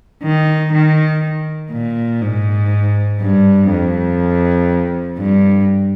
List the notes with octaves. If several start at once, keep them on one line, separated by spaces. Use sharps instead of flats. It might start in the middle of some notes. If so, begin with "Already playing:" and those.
D#3
D#3
A#2
G#2
G2
F2
G2